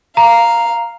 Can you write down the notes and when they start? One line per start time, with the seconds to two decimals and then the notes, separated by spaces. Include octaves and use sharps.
0.17 F5 A#5